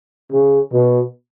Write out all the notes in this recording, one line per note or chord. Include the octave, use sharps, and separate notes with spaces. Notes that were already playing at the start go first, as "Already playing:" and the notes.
C#3
B2